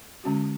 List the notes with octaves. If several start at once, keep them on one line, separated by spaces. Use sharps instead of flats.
D3 G#3 C#4 F#4